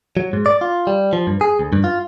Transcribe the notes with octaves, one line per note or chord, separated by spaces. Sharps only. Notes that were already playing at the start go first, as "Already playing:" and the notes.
F#3
G#2
D5
F4
G3
F3
G2
G#4
D2
G2
F4